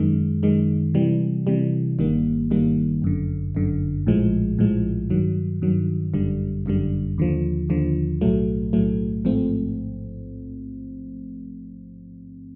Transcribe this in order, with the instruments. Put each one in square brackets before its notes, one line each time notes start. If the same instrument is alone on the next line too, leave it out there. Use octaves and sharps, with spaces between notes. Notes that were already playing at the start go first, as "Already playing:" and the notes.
Already playing: [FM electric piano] F#2 D#3 G#3
F#2 D#3 G#3
C3 E3 G3
C3 E3 G3
G1 G2 D#3 G3 A#3
G1 G2 D#3 G3 A#3
G1 F#2 D3
G1 F#2 D3
A#1 A2 F3 G#3
A#1 A2 F3 G#3
G2 D#3 F#3
G2 D#3 F#3
G1 F#2 D3 G3
G1 F#2 D3 G3
D#2 D3 F3
D#2 D3 F3
B1 A2 F#3 A3
B1 A2 F#3 A3
A1 G#2 F3 A3 C4